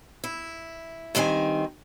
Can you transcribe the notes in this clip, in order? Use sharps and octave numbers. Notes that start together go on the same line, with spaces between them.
E4
G2 D#3 C4 A#4 G#5